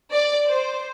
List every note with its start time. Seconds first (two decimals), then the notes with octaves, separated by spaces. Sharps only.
0.13 D5
0.48 C5